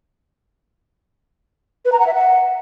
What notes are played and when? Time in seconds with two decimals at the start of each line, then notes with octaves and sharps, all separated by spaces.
1.85 B4
1.92 A#5
1.99 F#5
2.06 E5
2.13 F#5